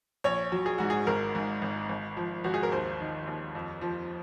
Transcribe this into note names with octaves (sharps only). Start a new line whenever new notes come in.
A#1 C#5
F#3
G#4
G#2 F#4
G#4
G#1 A#4
G#2
G#1
G#1
F3
G#1 F#4
G#4
A#4
D#2 C5
D#3
D#2
F2
F3